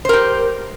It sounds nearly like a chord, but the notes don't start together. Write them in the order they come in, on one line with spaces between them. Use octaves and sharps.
C5 A#4 G4